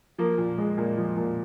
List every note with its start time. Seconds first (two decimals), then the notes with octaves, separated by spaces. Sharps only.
0.18 F3 A#3
0.38 A#2
0.58 G#3
0.78 A#2
0.97 F3
1.17 A#2